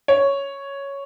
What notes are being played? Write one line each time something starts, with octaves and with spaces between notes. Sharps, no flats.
C#5